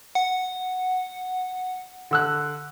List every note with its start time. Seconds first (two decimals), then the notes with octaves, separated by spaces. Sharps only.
0.15 F#5
2.11 D3 E6 F#6